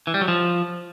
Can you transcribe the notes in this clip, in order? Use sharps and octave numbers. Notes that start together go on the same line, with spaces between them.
E3
G3
F#3
F3